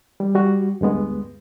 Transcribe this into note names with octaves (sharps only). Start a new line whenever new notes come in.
G3
G3 F#4
D2 G2 G#3 B3